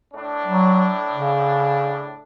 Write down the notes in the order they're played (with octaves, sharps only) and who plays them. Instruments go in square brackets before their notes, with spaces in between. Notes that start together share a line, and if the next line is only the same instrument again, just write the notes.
[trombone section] A2 D4
[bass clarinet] F#3
C#3